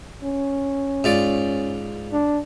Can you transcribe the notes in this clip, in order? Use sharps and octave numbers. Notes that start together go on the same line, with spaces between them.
C#4
G#2 F4 D5
D4